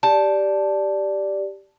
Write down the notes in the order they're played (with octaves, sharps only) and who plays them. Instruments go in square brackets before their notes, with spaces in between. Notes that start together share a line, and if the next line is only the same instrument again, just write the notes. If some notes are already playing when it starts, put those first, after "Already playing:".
[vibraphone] G4 D5 [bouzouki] A5